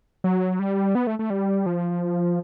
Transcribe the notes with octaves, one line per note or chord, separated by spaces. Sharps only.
F#3
G3
B3
A3
A3
G3
F3